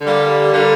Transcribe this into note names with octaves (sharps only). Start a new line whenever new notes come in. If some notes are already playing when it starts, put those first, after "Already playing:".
D3 G3 A#3
D3 G3 A#3